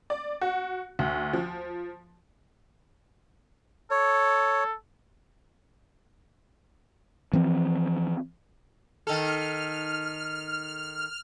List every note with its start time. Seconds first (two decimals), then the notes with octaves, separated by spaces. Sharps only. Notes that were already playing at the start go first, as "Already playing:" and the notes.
0.10 D5
0.41 F#4
0.99 D2
1.33 F3
3.91 A4 C#5
7.33 E3 F3 C4
9.07 D#3 A4 F6